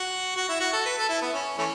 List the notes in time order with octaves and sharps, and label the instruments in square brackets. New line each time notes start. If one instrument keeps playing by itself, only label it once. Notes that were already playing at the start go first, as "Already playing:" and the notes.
Already playing: [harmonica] F#4
F#4
E4
F#4
A4
B4
A4
E4
B3
C#4
E3 A3 C#4